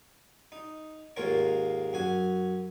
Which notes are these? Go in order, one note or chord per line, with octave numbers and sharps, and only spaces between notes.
D#4
D#2 G#2 A#3 F4 A#4 C#5
F#2 F#4 G#5